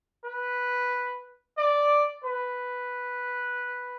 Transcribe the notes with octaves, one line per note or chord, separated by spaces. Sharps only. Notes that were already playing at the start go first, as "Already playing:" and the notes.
B4
D5
B4